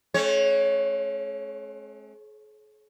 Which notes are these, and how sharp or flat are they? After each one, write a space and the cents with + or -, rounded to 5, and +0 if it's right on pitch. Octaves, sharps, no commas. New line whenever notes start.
G#3 +45 C#4 -45 C#5 +0